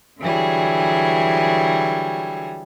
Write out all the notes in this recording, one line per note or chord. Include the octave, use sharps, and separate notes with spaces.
D3 E3 F#3 G3 G#4